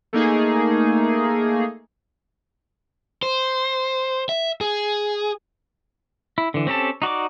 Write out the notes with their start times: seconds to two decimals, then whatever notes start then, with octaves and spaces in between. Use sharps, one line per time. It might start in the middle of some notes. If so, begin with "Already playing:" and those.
0.13 A3 A#3 D#4 G#4
3.23 C5
4.29 E5
4.61 G#4
6.38 E4
6.54 D3 E3
6.67 C4 C#4 G4 A4 A5
7.02 D#4 F#4 D5 D6